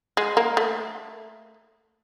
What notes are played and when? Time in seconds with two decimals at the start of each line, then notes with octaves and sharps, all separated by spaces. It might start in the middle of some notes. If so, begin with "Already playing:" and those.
0.17 G#3
0.37 A#3
0.57 A3